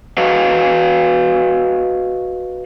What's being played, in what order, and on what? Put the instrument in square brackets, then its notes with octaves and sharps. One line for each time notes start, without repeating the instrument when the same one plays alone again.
[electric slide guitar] F#4 B4 D#5 F5